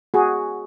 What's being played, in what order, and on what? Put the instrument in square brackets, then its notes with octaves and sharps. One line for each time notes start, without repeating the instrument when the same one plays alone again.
[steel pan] F#4 G#4